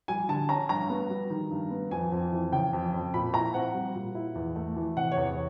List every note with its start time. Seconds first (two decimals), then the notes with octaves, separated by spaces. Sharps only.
0.08 G3 G#5
0.29 D3 A5
0.49 C#4 A#5
0.69 G2 A#5
0.90 B3
1.10 G3
1.30 D#3
1.51 G2
1.71 B3
1.91 F2 G#5
2.12 F2
2.32 E3
2.52 C#3 G5
2.73 F2
2.93 F2
3.14 A#2 B5
3.34 E4 A#5
3.54 C4 F#5
3.74 G3
3.95 A#2
4.15 E4
4.35 E2
4.56 A3
4.76 E3
4.97 C3 F#5
5.12 C#5
5.17 E2